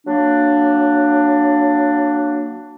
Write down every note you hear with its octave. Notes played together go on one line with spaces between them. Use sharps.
F#3 A#3 D4